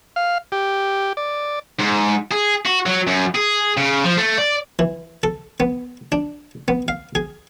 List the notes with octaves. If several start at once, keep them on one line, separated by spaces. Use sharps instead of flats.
F5
G4
D5
G#2
G#4
F#4
F#3
F#2
G#4
C#3
F3
A3
D5
E3
A4
B3
D4
B3
F5
G#4